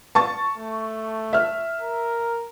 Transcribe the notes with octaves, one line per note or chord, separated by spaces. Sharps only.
A5 C#6 A6
A3
E5 F6
A#4